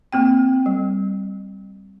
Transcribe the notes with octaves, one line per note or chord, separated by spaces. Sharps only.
A#3 C4 G5
G3